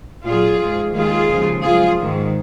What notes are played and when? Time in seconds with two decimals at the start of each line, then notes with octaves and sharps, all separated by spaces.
0.24 A#2 F#3 F4 G#4
0.59 G#2 F3 G#3
0.94 D#2 D#3 G#3 F4 G#4
1.29 D#2 C#3 F3 G#3
1.64 F#2 F3 G#3 F4 G#4
2.00 G#2 D#3 G#3